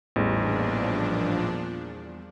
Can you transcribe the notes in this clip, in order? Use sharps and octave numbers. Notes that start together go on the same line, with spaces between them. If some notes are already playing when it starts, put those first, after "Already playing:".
A1 E2 A#2 F3 G3 D4